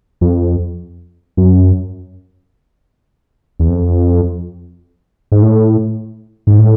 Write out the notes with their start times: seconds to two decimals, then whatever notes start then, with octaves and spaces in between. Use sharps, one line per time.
0.21 F2
1.37 F#2
3.60 E2
3.69 F2
5.32 G#2
5.42 A2
6.47 G#2
6.59 A2